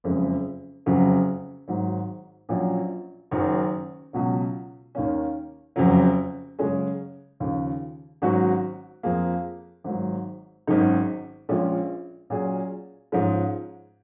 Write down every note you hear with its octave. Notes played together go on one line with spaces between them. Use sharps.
F#1 F2 C#3 G#3
F#1 F2 C#3 F#3
G#1 G#2 F#3
A#1 A#2 F#3 C#4
F#1 F#2 D#3 F#3
C#2 B2 F#3
D#2 D#3 A#3 C#4
F#1 F2 C#3 F#3
F#2 C#3 G#3 C#4 G#4
D#2 C#3 F3
G#1 G#2 F#3 C#4 F#4
F2 F3 A#3 F4 G#4
G#1 G#2 F#3
G#1 F#2 D#3 G#3 D#4
A#1 A#2 G#3 C#4 F4
A#2 F#3 C#4 F4 G#4
G#2 F3 G#3 C#4